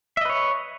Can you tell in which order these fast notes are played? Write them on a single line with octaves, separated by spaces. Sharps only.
E5 D#5 B4 C#5